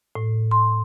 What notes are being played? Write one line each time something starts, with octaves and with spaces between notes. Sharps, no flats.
A2
C6